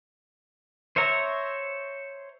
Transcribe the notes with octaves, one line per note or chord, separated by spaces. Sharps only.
C5 C#5 E5 A#5